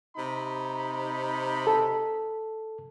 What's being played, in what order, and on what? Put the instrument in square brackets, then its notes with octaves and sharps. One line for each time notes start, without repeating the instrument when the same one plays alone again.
[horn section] C3 D#4 B5
[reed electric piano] A4